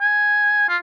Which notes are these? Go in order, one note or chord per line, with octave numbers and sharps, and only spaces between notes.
G#5
F4